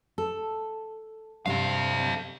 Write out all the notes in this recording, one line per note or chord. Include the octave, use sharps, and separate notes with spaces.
A4
G2 C3 A4 F5